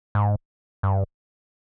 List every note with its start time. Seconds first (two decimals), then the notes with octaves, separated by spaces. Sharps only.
0.15 G#2
0.83 G2